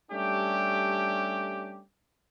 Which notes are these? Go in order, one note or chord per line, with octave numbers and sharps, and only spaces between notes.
G3 A3 C#4 D4 G4